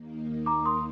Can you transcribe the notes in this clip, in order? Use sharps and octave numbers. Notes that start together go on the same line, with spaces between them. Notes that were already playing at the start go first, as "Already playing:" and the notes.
Already playing: D#2 D#3 A#3
A#5 D6
C6 D#6